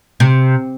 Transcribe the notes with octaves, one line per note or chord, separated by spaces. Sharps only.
C3